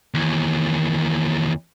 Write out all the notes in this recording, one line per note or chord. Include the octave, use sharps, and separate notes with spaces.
D#2 E3